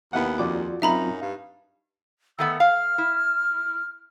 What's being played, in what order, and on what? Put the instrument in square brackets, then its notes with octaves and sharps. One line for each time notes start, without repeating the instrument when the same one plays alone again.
[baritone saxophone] D#2 [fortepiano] B3 E4 F#5
[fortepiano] F2 D6 [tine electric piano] F4 F#4 D5
[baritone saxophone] F#2 [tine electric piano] F#3 C4 F4 [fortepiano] D#4 [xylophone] E5 A#5 B5
[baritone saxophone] G2 [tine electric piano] F5
[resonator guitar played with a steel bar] D#3 A3 B3 [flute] E6
[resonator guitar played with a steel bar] F5 [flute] F6
[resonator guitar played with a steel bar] E4